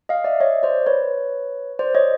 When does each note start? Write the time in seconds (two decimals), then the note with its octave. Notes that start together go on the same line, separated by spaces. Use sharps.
0.09 D#5 F5
0.24 D5 E5
0.40 C#5 D#5
0.63 C5 D5
0.87 B4 C#5
1.79 C5 D5
1.95 C#5 D#5